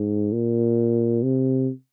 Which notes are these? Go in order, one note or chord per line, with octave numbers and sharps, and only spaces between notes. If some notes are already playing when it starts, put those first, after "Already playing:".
Already playing: G#2
A#2
C3